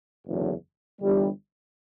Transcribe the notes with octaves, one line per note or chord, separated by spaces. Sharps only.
F#1 E2 D3 F#3
G1 G2 E3 G3